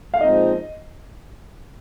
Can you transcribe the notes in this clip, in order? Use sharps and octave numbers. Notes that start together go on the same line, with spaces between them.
F5
A#2 F3 G#3 C4 D#4 D#5